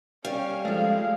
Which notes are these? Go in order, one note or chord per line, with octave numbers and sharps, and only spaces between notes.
G3 C#4 F5
F3 G#3 A3 F5